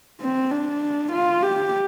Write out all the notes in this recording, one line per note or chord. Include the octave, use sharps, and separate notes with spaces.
C4
D4
F4
G4